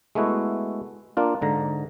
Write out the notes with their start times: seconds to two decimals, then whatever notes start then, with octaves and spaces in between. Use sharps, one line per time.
0.15 G#3 A3 B3 E4 F#4
1.17 A#3 D4 F4
1.42 G#2 D3 A#5